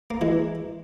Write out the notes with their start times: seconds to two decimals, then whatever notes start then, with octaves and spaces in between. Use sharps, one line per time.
0.11 A#3
0.21 E3 G#3